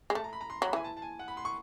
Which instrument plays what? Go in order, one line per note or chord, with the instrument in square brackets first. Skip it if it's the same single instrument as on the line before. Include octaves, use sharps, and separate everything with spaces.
[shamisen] G#3
[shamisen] A3 [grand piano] A5
[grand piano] A#5
B5
A#5
C6
[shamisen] F#3
[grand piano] B5
[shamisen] E3 [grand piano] G#5
[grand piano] A5
A5
G#5
F#5
B5
C6
C#6